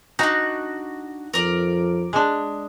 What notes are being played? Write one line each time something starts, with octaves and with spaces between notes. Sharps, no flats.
D4 D#4 F#4
F2 A#4 D5
G#3 D4